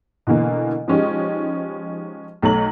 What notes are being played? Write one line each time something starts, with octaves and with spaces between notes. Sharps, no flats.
B2 D3 E3 A#3
F3 G#3 C#4 D#4 G4
B1 A3 C#5 A#5 F#7